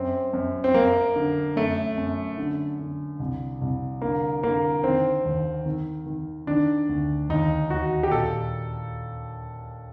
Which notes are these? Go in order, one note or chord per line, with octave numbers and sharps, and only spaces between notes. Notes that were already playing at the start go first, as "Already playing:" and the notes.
Already playing: F#2 C4
F#2
C4
F#2 A#3
D3
F#2 A3
F#2
D3
D3
C2
C2
D3 A#3
D3 A#3
D#3 C4
D#2
D#3
D#3
D#3 D4
D2
D#2 D#4
D#2 F#4
G4
A#2 A4